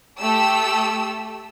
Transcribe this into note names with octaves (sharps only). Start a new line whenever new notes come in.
A3 G4 E6